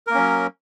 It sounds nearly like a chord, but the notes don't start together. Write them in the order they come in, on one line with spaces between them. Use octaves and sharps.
A#4 A#3 C#4 F#3